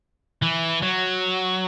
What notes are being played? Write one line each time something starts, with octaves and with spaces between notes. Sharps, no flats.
E3
F#3